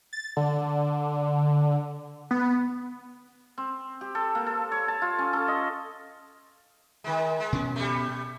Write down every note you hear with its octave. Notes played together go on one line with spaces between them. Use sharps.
A6
D3
B3
C4
G4
A4
A#3
A4
C#5
A5
F4
C#4
A4
D#5
D#3 G#3
G#3
B2 C#4
G3 A3